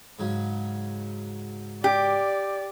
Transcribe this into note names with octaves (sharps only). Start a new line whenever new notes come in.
G#2 C#3 F#3
G4 D5